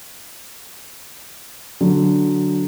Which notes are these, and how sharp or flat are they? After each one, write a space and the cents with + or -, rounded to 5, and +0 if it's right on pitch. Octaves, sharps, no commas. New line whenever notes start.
D3 -5 F#3 +0